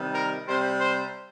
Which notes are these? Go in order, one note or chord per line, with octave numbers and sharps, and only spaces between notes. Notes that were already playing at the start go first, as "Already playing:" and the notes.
Already playing: C3 D#3 G3
A#4
C3 G3 C5
C5